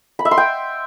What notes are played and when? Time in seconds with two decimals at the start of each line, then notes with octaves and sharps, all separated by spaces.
0.19 B5
0.25 E5
0.31 C6
0.37 G5